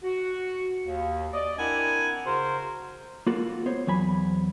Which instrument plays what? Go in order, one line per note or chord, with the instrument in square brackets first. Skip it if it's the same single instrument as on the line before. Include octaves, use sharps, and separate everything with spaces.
[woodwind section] F#4
D#2
D5 D#5
C4 D4 E4 A#4 F#5 G#5
C#3 F#4 A#4 C5
[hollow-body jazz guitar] A#3 F4 F#4 A4
B3 C5 C#5
E2 F#3 G#5 B5